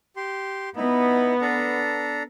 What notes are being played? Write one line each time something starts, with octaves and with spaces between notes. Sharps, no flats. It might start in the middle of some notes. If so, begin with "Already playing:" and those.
G4 C6
B3 D#4 E4
D4 A4 A#5